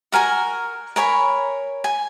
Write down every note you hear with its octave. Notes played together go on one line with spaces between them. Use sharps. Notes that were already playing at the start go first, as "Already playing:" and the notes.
F#4 A#4 G#5 A#5
A#4 C#5 G#5 B5
G#5